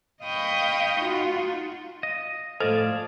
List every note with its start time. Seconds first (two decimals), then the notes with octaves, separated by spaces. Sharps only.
0.24 D#5 F5 G5 B5 C#6 D#6
1.02 D#4 F4 F#4
2.03 D#5 F5
2.60 A2 F3 G#4 A4 D5 D#5 A5